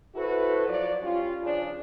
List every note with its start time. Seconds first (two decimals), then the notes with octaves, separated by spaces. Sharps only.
0.15 E4 F#4 A4 B4 C5
0.67 F3 F#3 D5
1.03 G3 C#4 F4
1.42 C#3 F3 D4